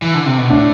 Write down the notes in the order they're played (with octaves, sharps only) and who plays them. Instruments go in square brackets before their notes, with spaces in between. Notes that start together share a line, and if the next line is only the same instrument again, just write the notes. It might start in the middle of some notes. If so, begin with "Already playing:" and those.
[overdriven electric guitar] E3
D3
C3
B2
[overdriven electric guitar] A2 [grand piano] D4